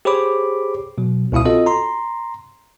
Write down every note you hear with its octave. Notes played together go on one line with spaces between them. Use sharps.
G4 G#4 C5 C#5 B5 D6
B2 F#3
C#2 B2 E4 F5 D#6
C4 F4 F#4 A4 D#5
A#5 C6